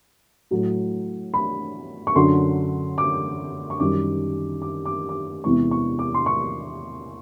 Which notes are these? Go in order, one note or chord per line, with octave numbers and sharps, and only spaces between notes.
A2 F#3
B5
C#6
F#2 D3 F#3 C6
D6
C#6
F#2 D#3 G3 D6
D6
D6
D6
E2 C3 E3 G#3 C#6
C#6
D6
C6
C#6